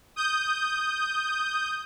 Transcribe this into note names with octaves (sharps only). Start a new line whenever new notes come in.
D#6 G6